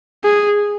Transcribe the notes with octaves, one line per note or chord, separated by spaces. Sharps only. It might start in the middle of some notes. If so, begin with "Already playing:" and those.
G#4